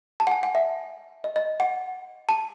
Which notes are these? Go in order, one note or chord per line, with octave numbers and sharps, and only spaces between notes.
A5
F#5
G#5
F#5
E5
D#5
D#5
F#5
A5